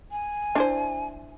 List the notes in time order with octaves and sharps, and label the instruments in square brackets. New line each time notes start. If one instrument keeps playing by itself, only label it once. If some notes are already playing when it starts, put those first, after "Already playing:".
[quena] G#5
[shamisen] D4 E4 C5